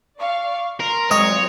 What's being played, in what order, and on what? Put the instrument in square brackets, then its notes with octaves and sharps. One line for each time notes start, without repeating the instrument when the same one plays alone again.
[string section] D5 F5 C#6
[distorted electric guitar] A#4 [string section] C6 F6
[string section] A#2 F#3 C4 [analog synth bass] G#3 [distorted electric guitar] C#5 [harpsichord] D#5